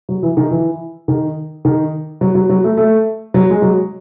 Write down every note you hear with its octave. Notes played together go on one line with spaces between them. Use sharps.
F#3
E3
D#3
E3
D#3
D#3
F#3
F#3
F#3
A3
A3
F#3
G#3
F#3